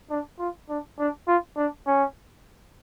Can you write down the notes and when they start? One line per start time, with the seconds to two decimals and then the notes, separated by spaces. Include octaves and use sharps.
0.11 D4
0.40 F4
0.69 D4
0.99 D4
1.28 F4
1.57 D4
1.87 C#4